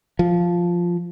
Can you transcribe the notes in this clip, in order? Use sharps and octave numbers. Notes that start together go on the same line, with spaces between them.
F3